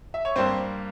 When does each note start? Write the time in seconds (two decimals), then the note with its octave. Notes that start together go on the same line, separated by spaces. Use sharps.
0.14 E5
0.25 C#5
0.36 G2 G3 A#3 C4 C5